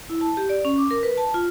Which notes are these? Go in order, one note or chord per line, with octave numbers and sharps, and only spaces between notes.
E4
A5
G4
D5
C#4
D6
A#4
B4
A5
F4